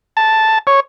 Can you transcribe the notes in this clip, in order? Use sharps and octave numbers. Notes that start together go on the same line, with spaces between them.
A5
C#5